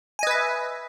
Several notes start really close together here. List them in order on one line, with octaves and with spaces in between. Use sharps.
G#5 D#5 B4 E5